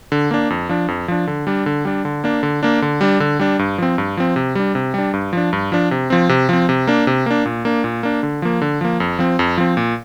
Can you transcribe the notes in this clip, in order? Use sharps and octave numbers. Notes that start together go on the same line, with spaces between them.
D3
A#3 D4
F2
F3 D4
F2
F3 D4
D3
G3 D4
D3
G3 D4
D3
A#3 D4
D3
A#3 D4
D3
G3 D4
D3
G3 D4
G2
F3 C4
G2
F3 C4
C3
G3 D4
C3
G3 D4
G2
F3 D4
G2
F3 D4
C3
F3 C4
C3
F3 C4
C3
A#3 D4
C3
A#3 D4
A#2
A#3 D4
A#2
A#3 D4
D3
F3 A#3
D3
F3 A#3
F2
F3 C4
F2
F3 C4
A#2